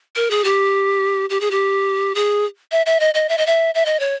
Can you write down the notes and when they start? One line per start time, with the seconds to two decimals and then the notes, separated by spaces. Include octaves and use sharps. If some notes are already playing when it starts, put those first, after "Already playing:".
0.16 A#4
0.30 G#4
0.44 G4
1.30 G4
1.41 G#4
1.51 G4
2.15 G#4
2.72 E5
2.86 E5
3.00 D#5
3.14 D#5
3.29 E5
3.38 D#5
3.46 E5
3.75 E5
3.86 D#5
4.00 C#5